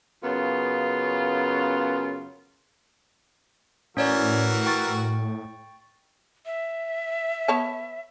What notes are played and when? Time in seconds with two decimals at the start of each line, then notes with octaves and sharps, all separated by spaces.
0.23 F#2 C#3 B3 F4
3.97 A2 E3 C#4 F#4 A#4 C#5 D5
4.66 G5 C#6 A6
6.46 E5
7.48 B3 C#5 A5